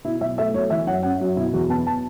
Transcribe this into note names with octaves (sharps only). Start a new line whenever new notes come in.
B2 E4
B1 E5
A3 E5
B1 C#5
E3 E5
F#2 F#5
C#4 F#5
F#2 F#4
B2 E4
E2 F#4
B3 A5
A5